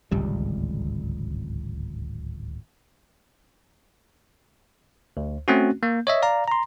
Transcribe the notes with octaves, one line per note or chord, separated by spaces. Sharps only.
D1 G#1 C#2 G3
D2
A3 C4 C#4 F#4
A#3
C#5 D#5 E5
D5 F5 A#5
A#5 C6